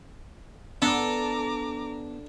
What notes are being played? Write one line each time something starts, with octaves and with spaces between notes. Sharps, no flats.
B3 D4 A4 A#5 D6